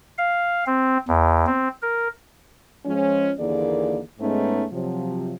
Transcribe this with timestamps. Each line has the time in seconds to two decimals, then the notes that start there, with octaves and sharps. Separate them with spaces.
0.18 F5
0.67 C4
1.08 E2
1.47 C4
1.82 A#4
2.86 F3 G#3 C#4
3.39 D#2 D3 E3 A#3 G#4 D5
4.20 G#2 G#3 A3 B3 C#4 D#4
4.72 C3 F3 F#3